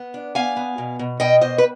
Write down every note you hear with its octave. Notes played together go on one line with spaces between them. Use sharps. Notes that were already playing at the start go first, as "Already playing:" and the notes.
Already playing: B3
D4
B3 F5 G#5
B3
B2
B2
B2 D#5 G5
B2 C5 D#5
B4